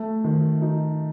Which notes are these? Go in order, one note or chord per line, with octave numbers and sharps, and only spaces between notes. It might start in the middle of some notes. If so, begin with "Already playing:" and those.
Already playing: A3
D#3
D#4